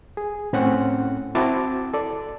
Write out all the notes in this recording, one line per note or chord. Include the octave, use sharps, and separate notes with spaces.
G#4
A2 C4 C#4 F#5
C4 E4 F#4 A5 D6
A4 D5